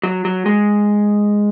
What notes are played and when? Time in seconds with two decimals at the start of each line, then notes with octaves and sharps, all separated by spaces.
0.03 F#3
0.25 F#3
0.46 G#3